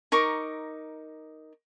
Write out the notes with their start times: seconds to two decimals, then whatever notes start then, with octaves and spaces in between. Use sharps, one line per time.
0.12 D#4 A#4 C#6 D6